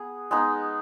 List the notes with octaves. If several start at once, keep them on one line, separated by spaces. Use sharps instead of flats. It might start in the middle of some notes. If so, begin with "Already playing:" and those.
Already playing: B3 G#4
G#3 B3 D#4